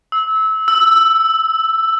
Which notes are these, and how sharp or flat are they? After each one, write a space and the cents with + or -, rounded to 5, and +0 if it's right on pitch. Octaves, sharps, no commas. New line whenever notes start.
E6 -25
E6 +5